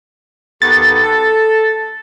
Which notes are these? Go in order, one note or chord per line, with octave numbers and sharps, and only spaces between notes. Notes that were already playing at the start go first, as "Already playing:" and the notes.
D#2 B3 A4 A6
A4